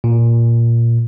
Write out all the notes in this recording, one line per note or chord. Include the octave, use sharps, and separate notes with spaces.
A#2